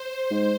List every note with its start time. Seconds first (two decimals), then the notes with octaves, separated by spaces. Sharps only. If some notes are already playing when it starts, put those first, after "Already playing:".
Already playing: C5
0.31 G#2